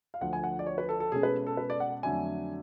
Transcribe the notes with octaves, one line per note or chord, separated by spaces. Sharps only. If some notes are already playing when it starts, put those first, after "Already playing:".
F5
D2 D3 F3 F#5
G#5
F#5
D5
C#5
B4
A4
A4
B2 G#3 C#4 G#4
B4
A4
B4
D5
F#5
F2 D3 F#3 A3 D4 G#5